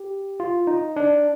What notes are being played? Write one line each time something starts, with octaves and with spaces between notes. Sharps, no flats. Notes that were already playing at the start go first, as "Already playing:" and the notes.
Already playing: G4
F4
D#4
D4